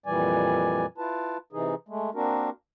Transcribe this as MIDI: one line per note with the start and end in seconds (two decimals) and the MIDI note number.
0.06 0.86 41
0.06 0.86 46
0.06 0.86 52
0.06 0.86 55
0.06 0.86 74
0.06 0.86 80
0.98 1.37 64
0.98 1.37 65
0.98 1.37 71
0.98 1.37 81
1.53 1.75 48
1.53 1.75 52
1.53 1.75 63
1.53 1.75 68
1.88 2.10 56
1.88 2.10 57
2.14 2.50 58
2.14 2.50 60
2.14 2.50 62
2.14 2.50 66
2.14 2.50 70